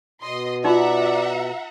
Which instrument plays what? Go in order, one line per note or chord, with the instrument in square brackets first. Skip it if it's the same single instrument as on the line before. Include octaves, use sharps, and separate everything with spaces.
[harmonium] B2 [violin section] D#5 C6
[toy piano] D#4 F4 [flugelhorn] D5 [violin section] E5 F#5 A#5